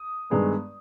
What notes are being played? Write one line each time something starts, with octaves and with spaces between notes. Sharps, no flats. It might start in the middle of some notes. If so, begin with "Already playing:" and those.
Already playing: D#6
G2 D#3 G#3 B3